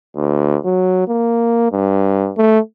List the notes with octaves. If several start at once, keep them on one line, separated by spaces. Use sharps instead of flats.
D2
F#3
A#3
G2
A3